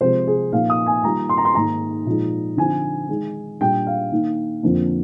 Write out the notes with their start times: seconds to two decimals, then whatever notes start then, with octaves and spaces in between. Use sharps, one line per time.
0.01 C3 F3 G#3 C5
0.27 G#4
0.52 A#2 F3 A#3 D#4 F5
0.70 D#6
0.86 G#5
1.04 D#3 G3 A#3 F4 A#5
1.29 C6
1.37 A#5
1.45 C6
1.54 G#2 D#3 A#3 D#4 A#5
2.06 A#2 F3 G#3 D#4
2.57 D3 F3 C4 D#4 G#5
3.09 D#3 G#3 D#4
3.61 A#2 G3 D4 G5
3.87 F5
4.12 D#3 A#3 D#4
4.63 F2 D3 F3 A#3